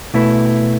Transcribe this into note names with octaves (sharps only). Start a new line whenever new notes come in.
B2 A3 E4 B4